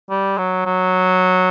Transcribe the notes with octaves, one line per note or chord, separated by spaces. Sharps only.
G3
F#3
F#3